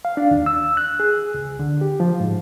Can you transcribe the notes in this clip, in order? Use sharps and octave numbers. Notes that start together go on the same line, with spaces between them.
F5
D4
D#2
E6
F#6
G#4
C#2
D3
G4
F3
G#2